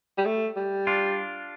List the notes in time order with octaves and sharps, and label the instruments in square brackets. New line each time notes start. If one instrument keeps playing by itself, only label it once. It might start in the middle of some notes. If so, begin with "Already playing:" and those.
[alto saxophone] G3
A3
G3
[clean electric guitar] D4 F4